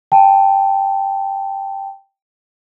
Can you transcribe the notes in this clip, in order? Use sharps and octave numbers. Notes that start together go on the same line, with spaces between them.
G5 A5